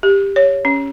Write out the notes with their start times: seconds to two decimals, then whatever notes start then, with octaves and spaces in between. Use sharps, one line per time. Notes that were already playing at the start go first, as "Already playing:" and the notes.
0.03 G4
0.36 C#5
0.65 C#4